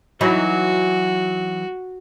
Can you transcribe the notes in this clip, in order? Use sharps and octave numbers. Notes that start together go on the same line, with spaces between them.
E3 F#3 D#4 F#4